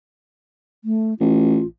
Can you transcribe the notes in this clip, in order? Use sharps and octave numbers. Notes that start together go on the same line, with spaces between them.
A3
A1 F4